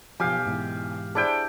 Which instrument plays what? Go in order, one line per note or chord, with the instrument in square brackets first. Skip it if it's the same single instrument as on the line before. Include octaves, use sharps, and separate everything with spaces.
[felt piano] B1 G#5 [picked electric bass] F3 [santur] G4 F5
[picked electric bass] G#2 B2 E3
[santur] D4 E4 G5 [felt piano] G#4 C5 D5